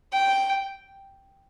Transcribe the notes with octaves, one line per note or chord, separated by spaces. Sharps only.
G5